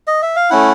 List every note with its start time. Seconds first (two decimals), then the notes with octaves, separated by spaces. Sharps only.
0.08 D#5
0.22 E5
0.36 F5
0.50 A3 C#4 E4 F#5